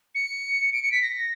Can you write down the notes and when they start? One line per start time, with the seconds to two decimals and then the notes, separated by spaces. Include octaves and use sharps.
0.14 C#7
0.72 D7
0.82 C#7
0.92 B6
1.02 A#6